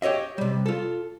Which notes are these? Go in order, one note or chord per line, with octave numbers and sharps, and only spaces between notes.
G4 C#5 D#5 E5
C3 G3
F4 A4